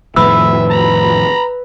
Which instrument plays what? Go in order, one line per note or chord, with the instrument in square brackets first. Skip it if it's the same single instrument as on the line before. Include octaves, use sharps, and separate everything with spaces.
[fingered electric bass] F2 A2 D#3 [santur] B4 [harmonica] E5 [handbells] E6
[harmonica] A#5 B5